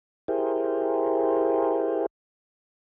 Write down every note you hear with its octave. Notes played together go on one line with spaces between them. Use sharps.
E4 G4 G#4 A#4 C5